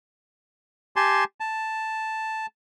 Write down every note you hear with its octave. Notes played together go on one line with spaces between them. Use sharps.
G4 G#5 A5 C6
A5